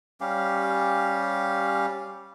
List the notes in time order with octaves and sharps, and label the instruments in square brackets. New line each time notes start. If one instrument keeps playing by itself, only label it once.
[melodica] G3 C#4 G4 F5